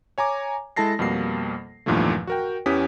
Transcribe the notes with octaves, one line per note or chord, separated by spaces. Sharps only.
C#5 G#5 A#5 D6
G#3 E4 A4 A5 A#6 C7
F2 B2 G3 A#3 C7
E2 G2 A#2 D#3 F3 A3
F#4 A#4 G5
E2 E3 C#4 G4 D#6 B6